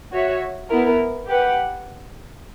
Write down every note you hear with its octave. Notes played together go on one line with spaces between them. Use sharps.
F#4 C#5 E5
B3 E4 A#4
G4 B4 F#5